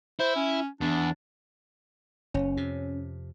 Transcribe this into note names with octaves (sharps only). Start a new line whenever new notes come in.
E4 C5
C#4
E2 D4
F#1 C#4
F2 C3